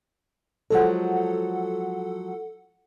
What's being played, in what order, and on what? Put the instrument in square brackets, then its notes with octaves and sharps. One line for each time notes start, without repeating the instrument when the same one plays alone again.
[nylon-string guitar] F3 F#3 G#3 [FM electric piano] A4 F#5